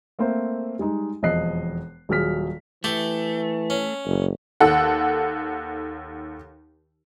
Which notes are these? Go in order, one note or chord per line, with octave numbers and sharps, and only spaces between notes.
A3 A#3 C4 C5
G3 G#3 D#4
E1 F2 D#5 F#6 C7
D#1 F#3 G#4 F6 B6
E3 A3 G4
C#4
F#1
D#2 A4 F#5